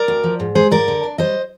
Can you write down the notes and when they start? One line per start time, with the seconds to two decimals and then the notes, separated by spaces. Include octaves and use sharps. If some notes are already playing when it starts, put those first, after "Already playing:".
Already playing: A#4 D5
0.08 D2
0.24 F3
0.40 G#2
0.55 G#3 G#4 C5
0.71 G#2 A#4 D5
0.88 D3
1.03 D4
1.18 G3 C5 D#5